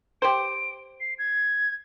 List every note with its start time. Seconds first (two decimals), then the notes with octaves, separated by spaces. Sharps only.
0.22 G4 C5 D7
1.01 C7
1.19 G#6